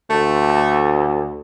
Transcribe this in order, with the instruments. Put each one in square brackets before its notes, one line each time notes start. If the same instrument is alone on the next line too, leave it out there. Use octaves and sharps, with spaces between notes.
[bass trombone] D2 [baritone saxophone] A3